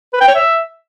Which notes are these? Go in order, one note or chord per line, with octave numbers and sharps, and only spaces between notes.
B4
G5
C#5
E5